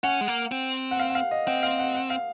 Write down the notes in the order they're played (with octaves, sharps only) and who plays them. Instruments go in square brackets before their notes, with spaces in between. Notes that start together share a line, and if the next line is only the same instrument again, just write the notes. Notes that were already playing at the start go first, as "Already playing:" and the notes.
[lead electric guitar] C#4 [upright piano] F#5
[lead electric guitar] G#3
A#3
C4
[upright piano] F#5
F5
F#5
F5
D#5
[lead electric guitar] C4 [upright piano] F#5
[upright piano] F5
F#5
F#5
F5